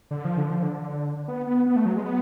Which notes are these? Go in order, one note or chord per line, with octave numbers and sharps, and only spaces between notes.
D3
F3
D3
F3
D3
B3
B3
B3
A3
F#3
G#3
B3